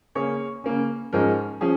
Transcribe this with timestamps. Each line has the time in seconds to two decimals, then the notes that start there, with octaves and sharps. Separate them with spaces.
0.15 C#3 A#3 C#4 G#4 C#5
0.64 C#3 A#3 C#4
1.13 G#2 F3 G#3 C#4 A#4
1.61 F3 C#4 G#4